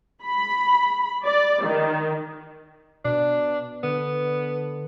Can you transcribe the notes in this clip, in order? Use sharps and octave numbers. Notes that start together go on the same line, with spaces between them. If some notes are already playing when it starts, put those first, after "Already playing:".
B5
D5
D#3
B2 D4
D3 B3